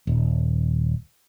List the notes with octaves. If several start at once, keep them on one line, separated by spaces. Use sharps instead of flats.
D#1